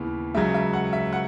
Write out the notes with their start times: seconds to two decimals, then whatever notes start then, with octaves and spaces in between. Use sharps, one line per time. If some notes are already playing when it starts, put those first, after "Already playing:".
Already playing: D#2 C#3 E3 B3
0.35 C#2 C#3 F#3 E5
0.54 E5
0.73 F#5
0.93 E5
1.13 F#5